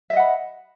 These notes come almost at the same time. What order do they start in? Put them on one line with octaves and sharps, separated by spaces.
E5 D#5 F#5 B5